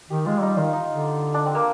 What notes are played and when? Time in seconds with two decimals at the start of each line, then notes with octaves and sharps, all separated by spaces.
0.10 D#3 G4
0.26 G#3 F4
0.42 G3 D#4
0.57 D#3 F4
0.73 D#4
0.88 D3
1.34 D4
1.46 C4
1.55 A#3